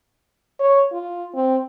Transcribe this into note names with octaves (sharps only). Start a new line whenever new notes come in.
C#5
F4
C4